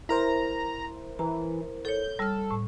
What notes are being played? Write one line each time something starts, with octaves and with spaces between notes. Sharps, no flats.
E4 A#4 C5 A#5
E3 A#5
A4 C#5 G6
G3 A4 F6
A2